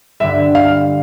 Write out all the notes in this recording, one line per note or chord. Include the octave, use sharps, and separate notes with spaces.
G2 D3 G3 E5
F5